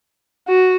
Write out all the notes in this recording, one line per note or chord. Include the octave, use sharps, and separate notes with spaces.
F#4